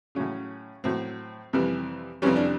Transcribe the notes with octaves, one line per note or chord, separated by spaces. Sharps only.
A2 C#3 F#3 C#4
A2 F#3 C4
F2 C3 E3 G3
F2 C3 E3 G3 C#4
D4